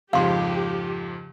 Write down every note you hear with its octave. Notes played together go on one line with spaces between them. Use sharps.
F2 G#2 C#3 F3 G4 F5 C6